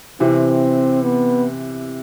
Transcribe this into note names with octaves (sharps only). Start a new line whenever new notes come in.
C3 E3 C4
B3